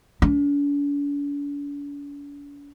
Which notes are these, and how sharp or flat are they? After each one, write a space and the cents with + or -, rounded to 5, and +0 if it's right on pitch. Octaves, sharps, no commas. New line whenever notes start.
D4 -45